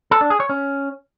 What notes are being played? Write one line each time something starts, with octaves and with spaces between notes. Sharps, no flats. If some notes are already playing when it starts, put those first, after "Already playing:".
A4
D4
G#4
C#5
C#4